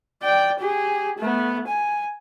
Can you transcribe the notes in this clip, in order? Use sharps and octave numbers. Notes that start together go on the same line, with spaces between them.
D5 G5
G4 G#4
A3 B3
G#5